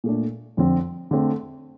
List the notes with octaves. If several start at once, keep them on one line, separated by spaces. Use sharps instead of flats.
A#2 A3 D4
F2 D3 F3 C4
D3 A3 C4